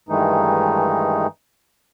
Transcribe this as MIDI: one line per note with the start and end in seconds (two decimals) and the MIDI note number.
0.09 1.27 43
0.09 1.27 51
0.09 1.27 52
0.09 1.27 56
0.09 1.27 57
0.09 1.27 63